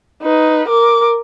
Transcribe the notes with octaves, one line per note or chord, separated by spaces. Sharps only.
D#4 B4
A#4 D6